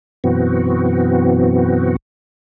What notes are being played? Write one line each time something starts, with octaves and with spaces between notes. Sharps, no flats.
F#2 B2 E3 B3 C4 F#4